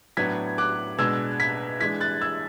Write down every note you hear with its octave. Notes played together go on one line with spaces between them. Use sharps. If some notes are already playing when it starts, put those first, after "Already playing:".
A2 F#3 B3 D4 G#6 B6
D6 F#6
B2 G#3 D4 E6 G#6
G#6 B6
E3 G#3 D4 G#6 B6
F#6 A6
E6 G#6